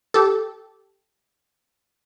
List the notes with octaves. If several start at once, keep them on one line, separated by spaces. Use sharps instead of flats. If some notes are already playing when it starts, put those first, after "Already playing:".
G4 A4